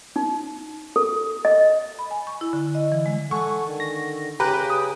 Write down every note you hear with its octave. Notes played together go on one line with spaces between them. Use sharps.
D#4
A4
D#5
B5
G#5
C#6
E4
D3
D#5
E3
G#3
A4 F#5 G#5 C#6
D3 D#3
A#6
C#3 G4 B4 G5 G#5 A#5 F#6
D#6